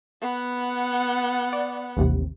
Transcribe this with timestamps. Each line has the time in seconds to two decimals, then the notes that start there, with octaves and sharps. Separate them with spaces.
0.21 B3 F#5
1.53 D5
1.97 A1 D#2 C3